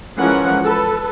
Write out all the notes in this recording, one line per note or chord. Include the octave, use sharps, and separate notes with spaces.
E3 F3 G#3 C#4 A#4 F#5
A4 B4